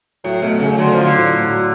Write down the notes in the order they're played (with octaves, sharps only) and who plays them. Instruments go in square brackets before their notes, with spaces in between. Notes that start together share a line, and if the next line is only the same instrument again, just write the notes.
[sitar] A2 [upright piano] F#3
[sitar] B2 [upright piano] A3
[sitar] C#3 [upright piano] A3
[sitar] D3 [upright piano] F#3
[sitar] F3 [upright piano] F4
[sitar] D3
[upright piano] A2
A2
F#3